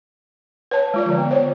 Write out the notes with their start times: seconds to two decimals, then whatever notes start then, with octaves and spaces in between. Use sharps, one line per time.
0.71 B4 C#5 A5
0.94 G#3 F4 D5
1.06 D3 F3
1.18 B3
1.31 C5 C#5